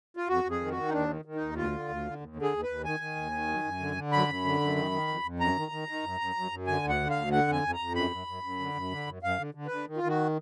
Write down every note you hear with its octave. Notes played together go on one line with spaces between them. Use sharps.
F4
F2 F#4
F2
G#4
D#3
F#4
D#3
D#4
D#2 D4
D#3
D#3
D#4
D#2
D2 F4
D3
D2
D3
D#2
D3
G#4
D#2
D#2 B4
D#3 G#5
D#3
D#2
D#3
F#2
F#2
D3
D3
F#2 B5
F#2
D3
F#2
D#3
D#3
F2
F2
F#2 A#5
D#3
D#3
D#3
F#2
F#2
F#2
F#2
D3 G#5
D2
F#5
D3
F5
D2
D3 F#5
F2 G#5
F2
A#5
F2
F#2 B5
F#2
F#2
F#2
D3
F#2
D3
F#2
F#2 F5
D3
D3
B4
D3
D#3
F4
D#3 F#4